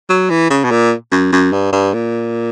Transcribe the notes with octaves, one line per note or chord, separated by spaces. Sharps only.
F#3
E3
C#3
B2
A#2
F#2
F#2
G2
G2
A#2